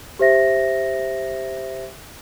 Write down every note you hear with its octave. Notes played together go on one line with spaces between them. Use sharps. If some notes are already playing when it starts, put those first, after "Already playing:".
G4 C5 E5 A#6